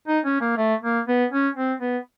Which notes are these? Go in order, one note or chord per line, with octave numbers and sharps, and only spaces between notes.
D#4
C#4
A#3
A3
A#3
B3
C#4
C4
B3